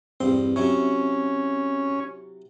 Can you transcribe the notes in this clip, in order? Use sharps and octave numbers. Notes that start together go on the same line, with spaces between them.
E2 G2 C4 C6
C3 F#3 C#4 E4